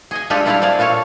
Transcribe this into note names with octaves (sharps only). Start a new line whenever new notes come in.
G#4 D#5 G#5
G#3 D4 F4 G4 A4 D5
G3 D4 E4 A4 D5 F5
C4 G#4 D5 F5
A#2 F4 A4 C#5 F5